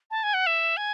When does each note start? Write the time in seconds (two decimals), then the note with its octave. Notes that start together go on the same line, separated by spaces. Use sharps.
0.11 A5
0.23 G#5
0.34 F#5
0.46 E5
0.77 G#5